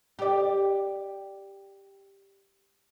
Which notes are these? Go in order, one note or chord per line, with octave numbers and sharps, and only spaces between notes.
G4 D5